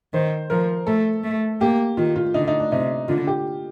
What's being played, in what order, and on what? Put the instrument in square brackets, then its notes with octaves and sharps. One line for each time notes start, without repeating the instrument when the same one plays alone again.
[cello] D#3 [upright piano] C5
[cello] F3 [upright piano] A#4
[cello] A3 [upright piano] A4
[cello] A3
[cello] A#3 [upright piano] G4
[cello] D#3 [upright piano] F4
[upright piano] F4
[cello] D3 [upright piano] D#4
[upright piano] D#4
D4
[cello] C3 [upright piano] D#4
[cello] D3 [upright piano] F4
[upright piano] G4